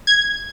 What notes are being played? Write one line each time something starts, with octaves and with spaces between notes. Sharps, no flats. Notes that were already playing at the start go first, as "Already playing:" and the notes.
G#6